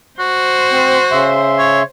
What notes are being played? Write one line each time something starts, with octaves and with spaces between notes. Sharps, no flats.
F#4 C5
C4
C#3 E5 C6
C#5